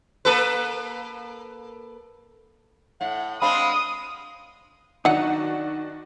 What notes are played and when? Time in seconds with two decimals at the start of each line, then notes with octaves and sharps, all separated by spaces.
0.25 A#3 A4 B4
3.01 A2 F#5
3.42 G#3 C4 D4 D#5 F5 G5 B5 D#6
5.05 D#3 F#3 D4 D#4 F#4 F#5